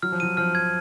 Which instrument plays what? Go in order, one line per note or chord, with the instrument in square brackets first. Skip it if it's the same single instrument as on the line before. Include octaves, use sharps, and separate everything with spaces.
[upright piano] F#3 [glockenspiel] F6
[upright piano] F3
[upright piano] F#3 [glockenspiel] D#7
[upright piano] F3 [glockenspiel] F6
[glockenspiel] G#6